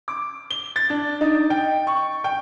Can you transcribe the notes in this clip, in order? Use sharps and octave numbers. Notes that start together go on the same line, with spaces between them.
D6
G7
A6
D4
D#4
G5
C#6
G5